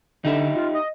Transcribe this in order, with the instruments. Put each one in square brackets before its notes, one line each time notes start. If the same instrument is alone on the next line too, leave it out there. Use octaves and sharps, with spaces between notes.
[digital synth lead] D3 [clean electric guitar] D#4 G4 E5
[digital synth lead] F4
D#5